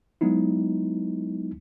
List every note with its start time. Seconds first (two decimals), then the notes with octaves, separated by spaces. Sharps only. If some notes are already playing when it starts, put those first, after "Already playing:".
0.21 F#3 G#3 B3 D#4 E4